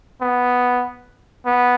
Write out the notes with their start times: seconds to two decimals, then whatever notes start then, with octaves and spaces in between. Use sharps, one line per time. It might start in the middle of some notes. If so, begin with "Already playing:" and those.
0.21 B3
1.46 B3